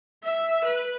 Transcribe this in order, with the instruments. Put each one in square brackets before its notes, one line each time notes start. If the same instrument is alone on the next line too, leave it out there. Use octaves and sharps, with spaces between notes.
[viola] E5
B4